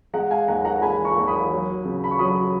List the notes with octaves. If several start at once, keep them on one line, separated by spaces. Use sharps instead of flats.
G#3 F#5 A#5
F5 G#5
D#2 F#5 A#5
F#5 A#5
G#3 G#5 B5
A#5 C#6
D#2
B5 D#6
F#3
C#3
B5
C#6
F#3 B5 D#6